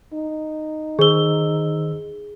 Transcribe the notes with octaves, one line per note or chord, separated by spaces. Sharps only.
D#4
D#3 G#4 C5 E6 G7